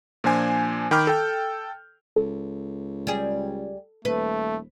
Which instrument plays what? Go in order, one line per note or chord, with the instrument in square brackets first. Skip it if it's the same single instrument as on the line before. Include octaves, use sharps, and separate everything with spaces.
[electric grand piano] A#2 F3 A#3 D4 C5 G#5
D#3 G5 B5 D6 F6 G6
A4 G5
[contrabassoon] C#2 [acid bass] A4
[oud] G3 G#4
[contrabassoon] D#1 [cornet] A3 [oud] B4